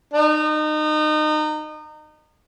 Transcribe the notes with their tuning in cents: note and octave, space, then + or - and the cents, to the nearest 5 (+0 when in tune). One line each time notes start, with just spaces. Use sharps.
D#4 -30